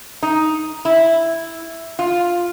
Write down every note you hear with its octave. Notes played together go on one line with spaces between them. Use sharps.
D#4
E4
F4